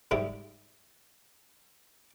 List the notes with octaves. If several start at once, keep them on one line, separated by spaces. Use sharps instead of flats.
G#2 G3 E4 G4